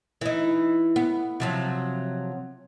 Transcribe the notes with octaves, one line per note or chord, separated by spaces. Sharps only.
E3 D#4
B3
C3 F3 F#3